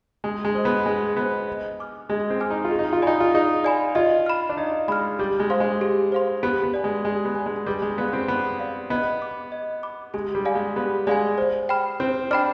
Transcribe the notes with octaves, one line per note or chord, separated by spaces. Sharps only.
G#3 G#4
G#3
C5 D#5
B3
G#3 G#4
B3 C5 D#5
D#5
G#5 D6 F6
G#3 D#5
C4
G#5 D6 F6
D#4
F4
G#4
D#4
F4
D#4 D5 G#5 B5
F4
D#4 G#4
D5 G#5 B5
F4 D#5
B5 F6
D4
D#4 D#5
G#3 B5 F6
G3 G4
G#3
C5 F5 C6
G#3
G4
C5 F5 C6
B3 G4
B3
D5 G#5
G#3
G#3 G4
B3
D5 G#5
G#3
G3 B4
G#3
B3 D5 F5
C4
B3 B4
D5 F5
B3 D#5
B5 D6
D#5
B5 D6
G#3 G4
G3
D5 F5 G#5
G#3
B3 G4
G#3 D5 F5 G#5
C5
G5 B5 F6
C4 C5
D4 G5 B5 F6